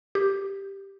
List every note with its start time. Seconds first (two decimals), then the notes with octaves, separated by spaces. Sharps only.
0.15 G4